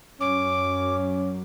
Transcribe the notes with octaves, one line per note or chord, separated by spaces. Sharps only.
F#2 C#4 D6